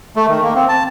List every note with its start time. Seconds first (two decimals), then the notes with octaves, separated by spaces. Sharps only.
0.16 A3
0.28 D#3
0.43 A#3
0.56 C4
0.69 A5